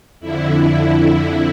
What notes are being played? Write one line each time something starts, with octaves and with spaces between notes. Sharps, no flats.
F2 D3 E4